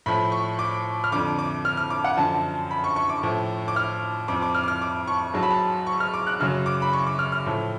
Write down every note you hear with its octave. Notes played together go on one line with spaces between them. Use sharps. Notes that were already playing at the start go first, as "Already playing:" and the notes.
A2 F3 B5
C#6
D6
F6
F2 D3 F3 D6
D6
F6
F6
D6
F#5
F#2 D3 F3 A5
B5
C#6
C#6
D6
A2 F3
D6
F6
F2 F3 D6
D6
F6
D6
F6
D6
C#6
G#2 F#3 A5
B5
A5
C#6
F6
D6
F#6
F#2 C#3 F#3 F6
D6
B5
C#6
D6
F6
F6
A2 F3